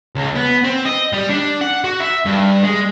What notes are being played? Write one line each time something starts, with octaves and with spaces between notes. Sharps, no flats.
C#2
B3
C4
D#5
G3
D4
F#5
F#4
E5
G2
G#3